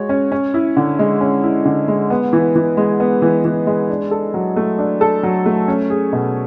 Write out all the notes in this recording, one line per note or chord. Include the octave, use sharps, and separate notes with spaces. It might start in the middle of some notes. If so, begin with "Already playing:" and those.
Already playing: G#3 F#4 C#5
C#4
C#4
E4
D3
G#3
C#4
E4
D3
G#3
B3
E3
E3
G#3
B3
E3
E3
G#3
D4
A4
F#3
A3
D4
A4
F#3
A3
C#4
G#4
B2